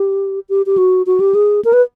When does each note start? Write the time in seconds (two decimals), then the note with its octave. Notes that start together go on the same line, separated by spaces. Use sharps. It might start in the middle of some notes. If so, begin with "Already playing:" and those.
Already playing: G4
0.49 G4
0.66 G4
0.78 F#4
1.06 F#4
1.20 G4
1.35 G#4
1.65 A#4
1.73 B4